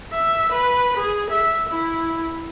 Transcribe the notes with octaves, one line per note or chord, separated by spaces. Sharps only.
E5
B4
G#4
E5
E4